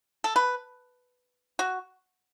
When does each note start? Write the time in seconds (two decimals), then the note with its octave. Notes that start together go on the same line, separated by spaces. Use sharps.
0.24 A4
0.36 B4
1.59 F#4